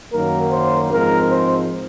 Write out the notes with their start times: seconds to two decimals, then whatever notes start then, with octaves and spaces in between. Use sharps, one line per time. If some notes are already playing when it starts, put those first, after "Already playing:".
0.12 F#2 D#3 F#3 A#3 A#4
0.52 C5
0.91 G#2 F3 G#3 C4 A#4
1.31 C5